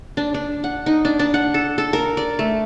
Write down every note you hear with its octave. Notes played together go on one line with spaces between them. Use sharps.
D4
D4
F#5
D#4
D4
D4
F#5
A4
A4
A#4
D5
A3